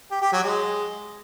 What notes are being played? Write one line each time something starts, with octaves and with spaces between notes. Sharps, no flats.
G4
G4
F#3
G#3